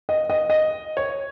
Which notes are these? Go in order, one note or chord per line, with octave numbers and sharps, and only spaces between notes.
D#5
D#5
D#5
C#5